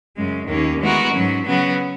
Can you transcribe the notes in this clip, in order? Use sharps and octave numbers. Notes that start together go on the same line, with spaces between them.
F#2 C#3 G#3
D#2 D#3 A#3 C#4
E3 G#3 B3 F#4 A#4
G#2 F#3 C#4
C#3 F#3 B3 F#4